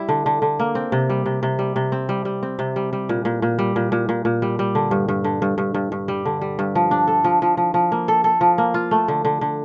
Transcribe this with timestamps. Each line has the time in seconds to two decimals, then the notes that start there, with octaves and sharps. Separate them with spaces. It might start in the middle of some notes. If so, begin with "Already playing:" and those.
Already playing: G3 E4
0.09 D3
0.26 D3
0.42 D3
0.59 A#3
0.75 C4
0.92 C3
1.10 G3
1.26 C3
1.43 C3
1.59 G3
1.76 C3
1.92 C4
2.09 G3
2.25 G3
2.43 C4
2.59 C3
2.76 G3
2.93 G3
3.09 A#2
3.25 A#2
3.42 A#2
3.59 G3
3.76 A#2
3.92 A#2
4.09 A#2
4.25 A#2
4.42 G3
4.59 G3
4.75 D3
4.91 G2
5.08 G2
5.24 D3
5.42 G2
5.58 G2
5.74 G2
5.92 G2
6.08 G3
6.25 D3
6.41 G3
6.59 G2
6.75 F3
6.91 D4
7.07 A4
7.24 F3
7.42 F3
7.57 F3
7.74 F3
7.92 A#3
8.08 A4
8.24 A4
8.41 F3
8.58 A#3
8.74 F4
8.91 A3
9.08 D3
9.25 D3
9.41 D3